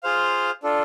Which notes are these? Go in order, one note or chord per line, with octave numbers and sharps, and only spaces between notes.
F4 G#4 C5 F5
D4 F4 A4